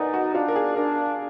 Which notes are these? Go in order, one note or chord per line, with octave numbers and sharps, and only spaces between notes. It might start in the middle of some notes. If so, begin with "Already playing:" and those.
Already playing: D#4 A#4 B4 D5 F#5 G#5
F#4
D4 F4
A#4
G#4
D4 A#4